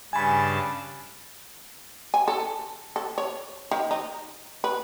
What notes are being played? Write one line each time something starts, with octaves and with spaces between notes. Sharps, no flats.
G2 C#3 G#5 A5 B5
G#5
A4
A4
C#5
D#3
D#4
B4